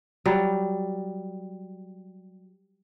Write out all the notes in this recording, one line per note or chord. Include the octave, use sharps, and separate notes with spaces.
F#3 G3